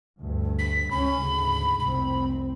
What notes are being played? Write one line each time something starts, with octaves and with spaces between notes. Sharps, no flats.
D2 G2
B6
C#2 C#4 B5
D2 G#2 C#3
F1 C2 C4 B5